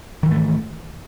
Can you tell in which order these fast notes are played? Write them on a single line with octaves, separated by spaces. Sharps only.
D#3 E3 G#2 A3